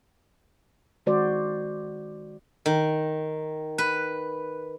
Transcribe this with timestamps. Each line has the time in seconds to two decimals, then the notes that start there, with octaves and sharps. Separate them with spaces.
1.06 D#3 G#3 F#4 C5 D5
2.66 D#3
3.78 B4